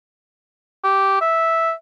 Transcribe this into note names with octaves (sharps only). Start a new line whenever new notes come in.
G4
E5